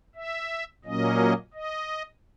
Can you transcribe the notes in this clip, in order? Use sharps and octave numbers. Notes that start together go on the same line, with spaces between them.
E5
A#2 F#3 A#3 C#4 D#5
D#5